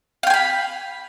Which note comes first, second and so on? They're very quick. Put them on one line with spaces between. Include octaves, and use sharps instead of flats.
F5 G5 G#5 B5